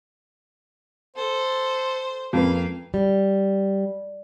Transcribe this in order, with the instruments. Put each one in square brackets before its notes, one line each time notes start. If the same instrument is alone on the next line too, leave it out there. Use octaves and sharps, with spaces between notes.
[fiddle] A4 [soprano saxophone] C5
[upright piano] F2 [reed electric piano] G#3 C#4 B4 [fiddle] A#3 F5
[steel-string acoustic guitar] G3